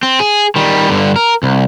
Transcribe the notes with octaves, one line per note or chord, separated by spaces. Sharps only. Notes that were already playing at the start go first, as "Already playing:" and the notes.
C4
G#4
D#3 G3
G2 D3
A#4
C2